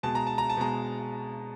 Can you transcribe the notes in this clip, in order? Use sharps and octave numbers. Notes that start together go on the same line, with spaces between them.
B2 G#3 A5
A#5
A5
A#5
A5
B2 G#3 A#5